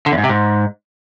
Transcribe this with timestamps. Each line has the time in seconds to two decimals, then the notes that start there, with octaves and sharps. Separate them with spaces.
0.06 D3
0.12 E2
0.18 G#2
0.24 C3
0.29 G#2